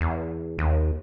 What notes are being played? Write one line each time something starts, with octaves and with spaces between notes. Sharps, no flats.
E2
D#2